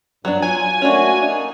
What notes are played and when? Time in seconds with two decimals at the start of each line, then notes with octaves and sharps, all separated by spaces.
0.25 G2 F#3 B3 D4
0.42 F#3 F4 G#5
0.82 A3 A#3 C#4 D4 F#4
1.22 A#3 D4 D#4